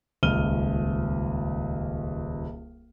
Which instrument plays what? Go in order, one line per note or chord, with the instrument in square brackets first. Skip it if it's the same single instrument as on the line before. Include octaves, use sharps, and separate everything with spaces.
[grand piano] D#1 C#2 F6 D#7 G7